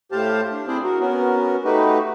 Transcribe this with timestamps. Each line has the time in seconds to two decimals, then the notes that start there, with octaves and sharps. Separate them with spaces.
0.12 A2 G4 C5 F5 A5
0.52 D4
0.68 C4 D4 E4 G#4 C5 D5
0.83 F#4 A#4
1.00 B3 C#4 F#4 A#4
1.65 A3 D#4 F#4 G4 B4